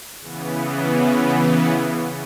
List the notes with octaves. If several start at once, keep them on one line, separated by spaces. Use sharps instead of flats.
C#3 E3 B3